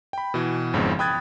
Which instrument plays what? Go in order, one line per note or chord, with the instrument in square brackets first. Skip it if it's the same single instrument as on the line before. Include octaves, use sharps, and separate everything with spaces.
[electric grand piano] G5 B5
B2 E3
G#1 F2 G#2 C#3 B3
G5 B5 D#6 F#6 G#6 A6